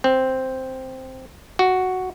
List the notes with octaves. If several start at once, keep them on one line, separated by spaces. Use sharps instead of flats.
C4
F#4